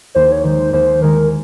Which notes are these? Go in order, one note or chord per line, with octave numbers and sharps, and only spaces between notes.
D#2 C5
C#5
D#3 G#3 C5
D#2 C5
D#3 G#3 A#4